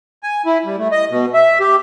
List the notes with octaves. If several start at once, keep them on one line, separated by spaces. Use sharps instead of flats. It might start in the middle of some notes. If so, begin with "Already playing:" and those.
G#5
E4
G3
A3
D#5
B2
E5
G4